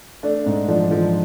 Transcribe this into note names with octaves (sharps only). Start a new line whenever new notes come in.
A3 D4
G#2
F3 D4
F3